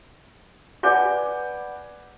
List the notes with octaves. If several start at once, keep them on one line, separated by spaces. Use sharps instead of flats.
B4 D5 F#5 G#5 D6 G6